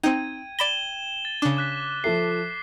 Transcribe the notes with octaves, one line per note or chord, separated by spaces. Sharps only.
C4 D#4 G5 G#6 D#7
D5 B5 A#6 E7 G7
A6
C#3 D4 D6
D6 F#6 B6
F3 A4 E5 C7